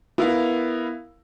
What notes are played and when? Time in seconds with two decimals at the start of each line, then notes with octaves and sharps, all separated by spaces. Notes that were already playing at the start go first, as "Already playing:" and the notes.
0.18 B3 E4 A#4 F5